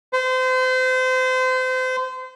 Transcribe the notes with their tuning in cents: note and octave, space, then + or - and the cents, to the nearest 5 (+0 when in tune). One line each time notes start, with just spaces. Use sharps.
C5 -30